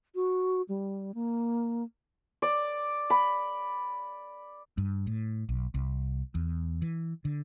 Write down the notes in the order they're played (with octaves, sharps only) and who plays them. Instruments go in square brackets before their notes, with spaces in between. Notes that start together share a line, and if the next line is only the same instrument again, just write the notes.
[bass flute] F#4
G3
A#3
[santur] D5
B5
[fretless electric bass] G2
A2
B1
C2
E2
E3
D3